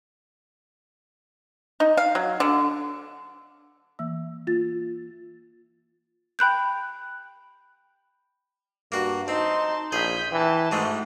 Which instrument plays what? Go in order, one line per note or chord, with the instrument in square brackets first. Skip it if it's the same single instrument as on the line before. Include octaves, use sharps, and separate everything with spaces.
[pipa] D#4
F5
F#3
D3
[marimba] E3 A#3 E5 E6
A#3 F4 A6
[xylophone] G5 B5 F#6 G6
[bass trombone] G2 [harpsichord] A#3 F#4
[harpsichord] C4 [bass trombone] D#4 [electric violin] A5 C6
[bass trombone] A#1 [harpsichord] G#4 [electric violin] G6 B6
[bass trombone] E3 [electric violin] G5 A5
[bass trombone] G#2 [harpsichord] E3 G#3 A3 [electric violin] F#4